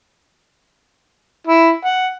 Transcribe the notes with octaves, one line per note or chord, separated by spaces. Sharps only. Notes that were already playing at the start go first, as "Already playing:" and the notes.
E4
F#5